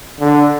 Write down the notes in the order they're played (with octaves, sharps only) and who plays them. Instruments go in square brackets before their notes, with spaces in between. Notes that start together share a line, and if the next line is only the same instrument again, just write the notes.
[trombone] D3